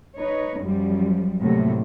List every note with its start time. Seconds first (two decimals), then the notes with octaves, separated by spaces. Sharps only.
0.15 D#4 B4 C#5
0.61 F#2 F3 G3
1.42 D2 A2 C3 F#3 A#3